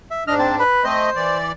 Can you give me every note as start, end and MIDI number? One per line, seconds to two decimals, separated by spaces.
0.11 0.24 76
0.28 0.64 44
0.28 0.64 62
0.28 0.35 75
0.28 0.35 89
0.39 0.56 60
0.39 0.56 81
0.59 0.84 71
0.59 0.84 83
0.84 1.10 57
0.84 1.10 60
0.84 1.38 72
0.84 1.10 75
1.16 1.52 52
1.16 1.52 74